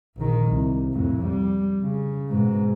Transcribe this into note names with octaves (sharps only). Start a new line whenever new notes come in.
A#1 D#3
C2
F2 A2
G3
C#3
G#2 B2